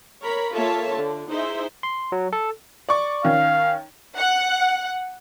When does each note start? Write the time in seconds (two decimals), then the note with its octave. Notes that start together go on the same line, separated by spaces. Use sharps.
0.22 A#4 C#5 A#5 B5
0.52 A#3 F4 A4 C#5 E5 A5
0.93 D3
1.30 D#4 E4 G#4 C5 E5
1.83 C6
2.12 F#3
2.33 A4
2.89 D5 C#6
3.25 D#3 C#4 F5
4.17 F#5